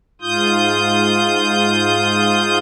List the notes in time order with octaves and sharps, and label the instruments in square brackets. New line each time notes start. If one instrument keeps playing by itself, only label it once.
[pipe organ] G#2 F4 D#6 G6